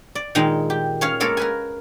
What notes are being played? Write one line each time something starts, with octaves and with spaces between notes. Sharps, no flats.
D5
A#2 D#3 G#3 D#4
G4
C#4 C#5 F5
G#3 A#3 A4 A#4 C#5
A#4 B4 G#5